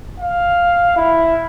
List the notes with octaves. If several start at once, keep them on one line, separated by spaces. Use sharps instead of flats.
F5
E4